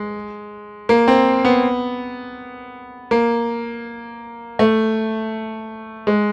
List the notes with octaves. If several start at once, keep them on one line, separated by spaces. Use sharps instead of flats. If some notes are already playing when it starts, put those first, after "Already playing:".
Already playing: G#3
A#3
C4
B3
A#3
A3
G#3